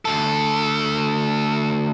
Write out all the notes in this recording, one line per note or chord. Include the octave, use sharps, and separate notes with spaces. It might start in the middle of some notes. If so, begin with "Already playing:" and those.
D2 A4